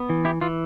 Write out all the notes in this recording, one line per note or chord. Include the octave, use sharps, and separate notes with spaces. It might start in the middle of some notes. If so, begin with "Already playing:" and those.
Already playing: B3
E3
E4 G4
E3 F4